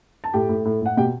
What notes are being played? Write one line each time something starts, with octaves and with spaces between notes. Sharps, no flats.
A5
A2 G4 G5
A2
A2
A2 F#5
B2 G4 G5